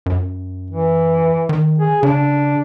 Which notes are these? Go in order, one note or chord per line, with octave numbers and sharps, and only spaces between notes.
F#2
E3
D#3
G#4
C#3 D4